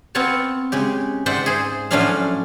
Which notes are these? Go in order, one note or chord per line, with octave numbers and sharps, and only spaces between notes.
B3 C4 F4 C#5 A5
C#3 G#3 G4
G#2 C5 D5 E5 F#5 G5
G#4 C5
A2 F3 F#3 C#4 D4 F5